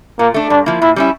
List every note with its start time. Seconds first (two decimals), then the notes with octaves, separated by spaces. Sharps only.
0.19 A#2 A#3
0.34 A3 D4
0.50 G2 D4
0.66 F3 A#3 E4
0.81 A#2 E4
0.96 G3 C#4 E4